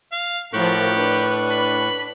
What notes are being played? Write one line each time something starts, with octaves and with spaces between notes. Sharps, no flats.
F5
A2 F3 F#4 G4 A#4 C#6 F#6
D4 B4
B5